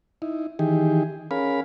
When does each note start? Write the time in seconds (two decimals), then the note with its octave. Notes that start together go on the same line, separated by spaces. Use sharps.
0.22 D#4 E4
0.59 D#3 E3 D#4 G4 G#4
1.31 C#4 G#4 A#4 F5 B5